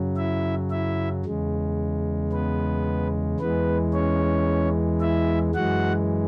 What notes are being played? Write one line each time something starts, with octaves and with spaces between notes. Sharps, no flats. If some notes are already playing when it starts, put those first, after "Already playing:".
Already playing: F#2 C#3 F#3
E4 E5
E4 E5
E2 C#3 G#3
B3 B4
E2 E3 G#3 B3 B4
C#4 C#5
E4 E5
F#2 E3 G#3 F#4 F#5